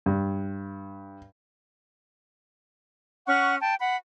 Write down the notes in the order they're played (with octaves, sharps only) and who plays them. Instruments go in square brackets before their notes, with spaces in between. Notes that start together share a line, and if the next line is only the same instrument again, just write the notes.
[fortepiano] G2
[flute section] C#4 F#5 C#6 F#6
G5 A5
F#5 B5